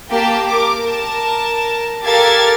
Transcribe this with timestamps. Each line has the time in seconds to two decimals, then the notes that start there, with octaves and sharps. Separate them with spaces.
0.11 A#3 G4 G5 A5
0.48 A#4 D6
0.85 A#4 A5
2.05 G4 A4 A#4 F5 G#6 A6